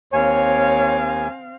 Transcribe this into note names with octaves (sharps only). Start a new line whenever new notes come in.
D#2 C4 C#5 F5 G#5